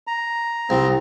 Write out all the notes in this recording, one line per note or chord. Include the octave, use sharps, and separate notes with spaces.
A#5
C2 C4